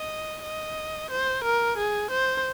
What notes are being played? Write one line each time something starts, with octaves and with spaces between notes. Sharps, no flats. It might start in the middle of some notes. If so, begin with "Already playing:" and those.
Already playing: D#5
D#5
C5
A#4
G#4
C5